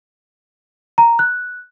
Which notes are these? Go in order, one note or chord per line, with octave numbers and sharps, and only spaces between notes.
A#5
F#6